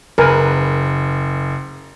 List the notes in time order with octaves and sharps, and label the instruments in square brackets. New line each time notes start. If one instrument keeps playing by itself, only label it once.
[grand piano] F#1 [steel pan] A#4 B4 G#5